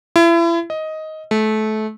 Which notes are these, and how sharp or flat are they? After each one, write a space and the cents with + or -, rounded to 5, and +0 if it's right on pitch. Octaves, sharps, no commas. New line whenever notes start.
E4 +35
D#5 +10
A3 -25